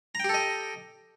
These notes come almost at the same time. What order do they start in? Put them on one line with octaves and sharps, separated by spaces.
A#5 G5 G4 A4 D#5